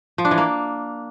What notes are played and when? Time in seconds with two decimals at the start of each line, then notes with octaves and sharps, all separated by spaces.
0.18 F3
0.25 D4
0.31 E3
0.38 A#3